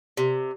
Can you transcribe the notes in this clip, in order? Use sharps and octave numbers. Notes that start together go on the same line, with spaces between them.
C3